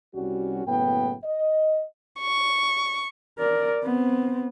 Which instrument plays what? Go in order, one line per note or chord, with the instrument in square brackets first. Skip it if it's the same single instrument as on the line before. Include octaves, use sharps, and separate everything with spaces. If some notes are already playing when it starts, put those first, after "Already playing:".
[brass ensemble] C2 G3 C#4 F#4
F#1 A2 B3 G5
D#5
[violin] C#6
[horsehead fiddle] A#4 D5
B3 C4